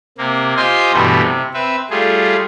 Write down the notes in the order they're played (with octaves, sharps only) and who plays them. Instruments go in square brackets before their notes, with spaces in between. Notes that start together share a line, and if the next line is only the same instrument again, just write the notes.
[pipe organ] C3 A#3
F4 G4 C5 D#5 G#5 C6
G2 B2 E3 G3 A3
C3
C4 B4 E5
G3 A3 F4 G#4